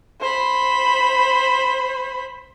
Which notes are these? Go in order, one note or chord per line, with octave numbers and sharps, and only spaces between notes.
C5 B5